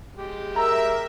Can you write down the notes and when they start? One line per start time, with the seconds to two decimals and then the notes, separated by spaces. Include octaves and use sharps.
0.16 G#3 G4
0.56 A#4 E5 A#5 E6